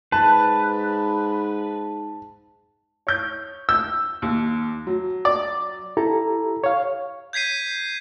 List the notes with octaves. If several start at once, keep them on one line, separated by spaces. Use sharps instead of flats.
G#2 B4 A5
C#5 G6
E6 G6
D#2
F#3
D5
E4 G4 A4 A#5
C#5 F5
G6 G#6 B6 C7 D#7